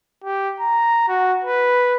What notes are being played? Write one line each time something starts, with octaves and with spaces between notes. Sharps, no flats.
G4
A#5
F#4
B4